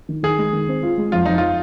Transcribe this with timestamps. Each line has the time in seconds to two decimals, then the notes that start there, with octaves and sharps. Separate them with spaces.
0.09 D#3
0.23 D#3 G#4
0.38 G#3
0.53 D#3
0.68 C4
0.83 F4
0.98 G#3
1.12 F2 F4
1.26 F2 D#4
1.38 F4